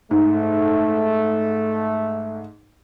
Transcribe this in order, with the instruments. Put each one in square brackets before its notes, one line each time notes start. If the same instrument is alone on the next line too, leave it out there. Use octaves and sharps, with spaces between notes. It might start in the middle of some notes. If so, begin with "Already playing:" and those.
[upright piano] G#2 [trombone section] A3